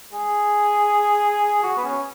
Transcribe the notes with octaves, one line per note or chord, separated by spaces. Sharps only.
G#4
F#4
B3
C#4